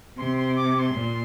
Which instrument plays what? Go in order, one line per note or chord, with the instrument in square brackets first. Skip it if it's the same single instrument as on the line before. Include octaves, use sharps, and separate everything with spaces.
[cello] C3 [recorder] C6
[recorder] C6
D6
D6
C6
[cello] A#2